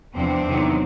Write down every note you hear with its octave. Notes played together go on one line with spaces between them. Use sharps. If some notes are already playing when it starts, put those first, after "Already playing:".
E2 C3 F3 C4 D4
E2 C3 D#3 F#3